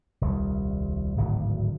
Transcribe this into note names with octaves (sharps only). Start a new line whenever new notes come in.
D#1 C2
D1 G#1 D2 D3